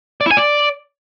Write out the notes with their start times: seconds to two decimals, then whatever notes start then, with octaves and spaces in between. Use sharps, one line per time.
0.21 D5
0.26 E4
0.31 G#5
0.37 D5